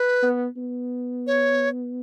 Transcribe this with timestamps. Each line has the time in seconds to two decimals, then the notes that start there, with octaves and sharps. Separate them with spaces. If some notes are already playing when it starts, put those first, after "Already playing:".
Already playing: B4
0.23 B3
0.57 B3
1.27 C#5